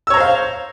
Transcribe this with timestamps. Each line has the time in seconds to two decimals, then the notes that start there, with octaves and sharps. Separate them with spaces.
0.07 E6
0.10 C#5
0.14 A#5
0.17 C5
0.20 F5